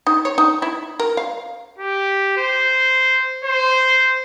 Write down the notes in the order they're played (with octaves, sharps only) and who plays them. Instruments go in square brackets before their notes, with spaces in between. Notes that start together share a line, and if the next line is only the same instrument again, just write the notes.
[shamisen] D#4
C#5
D#4
E4
A#4
F5
[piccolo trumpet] G4
C5
C5